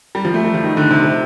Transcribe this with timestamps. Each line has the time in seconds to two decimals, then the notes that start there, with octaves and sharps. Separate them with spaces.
0.15 G3
0.25 F3
0.34 A3
0.44 G3
0.54 F3
0.64 D#3
0.77 D3
0.91 C3
1.04 C3